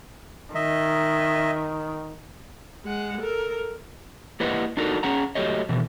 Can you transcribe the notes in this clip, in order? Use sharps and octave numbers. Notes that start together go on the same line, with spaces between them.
D#3 D#5 E5
G#3 F#5
A4 A#4
A#3 E4 G4 B4 D#5 F#5
D4 D#4 F#4 A4 A#4
C#4 G#4 F#5 A#5
F#3 A3 G4 C#5 D#5
B2 D#3 E3